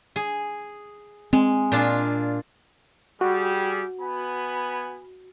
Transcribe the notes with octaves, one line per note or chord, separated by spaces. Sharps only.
G#4
G#3 C4
A#2 D4 F4
G3 F#4 G#4
B3 G#5 B5